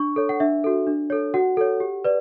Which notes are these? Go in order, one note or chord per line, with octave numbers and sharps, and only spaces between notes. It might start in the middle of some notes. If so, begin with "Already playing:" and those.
Already playing: D4 C#6
A4 C#5
F#5
D4 E5
F#4 A4
D4
A4 C#5
F#4 F#5
A4 C#5
G4
B4 D5